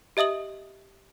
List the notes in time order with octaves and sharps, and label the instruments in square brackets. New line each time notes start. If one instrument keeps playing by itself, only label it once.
[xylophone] G4 D#5 E5 D#6 F#7